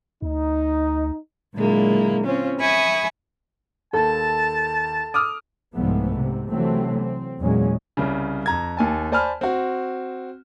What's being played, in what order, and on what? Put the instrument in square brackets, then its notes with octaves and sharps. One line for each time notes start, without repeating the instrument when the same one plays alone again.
[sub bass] D2 [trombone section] D#4
[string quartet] A#2 D3 F#3 G#3 A#3 E4
C4 C#4 F4
E5 G#5 B5 C#6 D#6
[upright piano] D#2 [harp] A4 [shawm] A5
[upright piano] D6 D#6 F6
[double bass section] C2 G#2 F3 G3 A3 B3
G#2 C3
C3 E3 F#3 A3 C4
C4
E2 A#2 F#3 G#3 C#4
[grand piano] C2 C#3
F2 A#5 G#6
D#2 G#5 A5
C5 D5 G#5 A5 B5 F6
C4 F#4